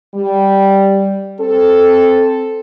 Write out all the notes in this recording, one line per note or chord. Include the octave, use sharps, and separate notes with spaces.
G3
C4 A4